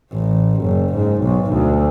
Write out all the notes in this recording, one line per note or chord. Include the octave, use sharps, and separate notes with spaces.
A1
F#1
G#2
B1
D2